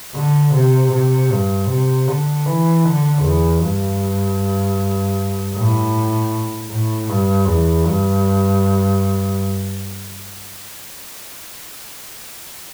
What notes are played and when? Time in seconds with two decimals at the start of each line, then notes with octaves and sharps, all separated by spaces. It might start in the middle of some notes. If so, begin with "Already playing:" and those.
0.15 D3
0.54 C3
0.92 C3
1.31 G2
1.69 C3
2.08 D3
2.46 E3
2.85 D3
3.23 E2
3.62 G2
5.55 A2
6.71 A2
7.09 G2
7.48 E2
7.86 G2